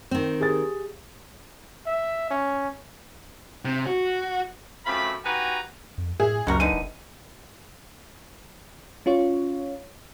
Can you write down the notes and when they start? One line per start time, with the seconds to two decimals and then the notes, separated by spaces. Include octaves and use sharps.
0.11 D#3 C4
0.40 G4 G#4 A6
1.86 E5
2.31 C#4
3.65 C3
3.87 F#4
4.86 F#2 A3 C4 F4 B5
5.25 D#4 F#4 G4 B4 G#5 A#5
5.98 F2
6.20 A2 G#4 E5
6.47 F#1 C#2 G3 F#4 A#4
6.60 D3 E3 D#4 D#7
6.72 F1
9.06 C#4 F4 C#5